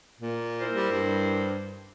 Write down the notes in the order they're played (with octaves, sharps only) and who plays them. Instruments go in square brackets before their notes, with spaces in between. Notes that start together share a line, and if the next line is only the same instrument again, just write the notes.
[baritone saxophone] A#2
[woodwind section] E4 A#4 C5
[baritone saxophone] G3
G2